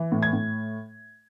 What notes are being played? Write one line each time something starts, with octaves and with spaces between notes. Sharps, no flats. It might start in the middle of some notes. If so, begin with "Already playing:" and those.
Already playing: E3
A2
G#6
A2